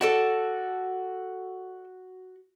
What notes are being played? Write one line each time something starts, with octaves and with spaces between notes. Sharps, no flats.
F#4 A4 D5 A5